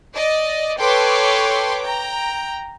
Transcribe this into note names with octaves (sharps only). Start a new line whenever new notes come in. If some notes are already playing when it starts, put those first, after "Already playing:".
D5 D#5
A4 B4 C#5 G5 C6 D6
G5 A#5